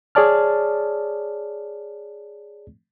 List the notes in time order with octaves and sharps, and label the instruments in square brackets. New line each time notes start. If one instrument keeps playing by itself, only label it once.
[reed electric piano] G#4 C#5 D5 A5 F6